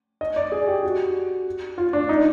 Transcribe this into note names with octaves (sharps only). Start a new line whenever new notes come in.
D#5
D5
G#4
G4
F#4
F4
D4
D#4